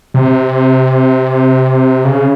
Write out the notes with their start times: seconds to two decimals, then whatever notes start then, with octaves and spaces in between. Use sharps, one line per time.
0.14 C3
2.04 C#3